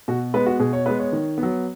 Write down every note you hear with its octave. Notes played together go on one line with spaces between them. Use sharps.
B2 F#4
G#3 B3 B4
F#4
B2 G#4
C#5
G#3 B3 B4
C#5
D#3
B3
F#3